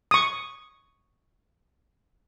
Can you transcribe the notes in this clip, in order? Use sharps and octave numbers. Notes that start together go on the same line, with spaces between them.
C#6 D#6